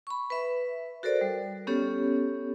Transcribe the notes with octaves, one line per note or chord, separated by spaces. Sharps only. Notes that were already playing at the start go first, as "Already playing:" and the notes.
B5 C#6
B4 E5
F#4 A4 A#4 C5 D5
G3
B3 C#4 G4 A4 C#5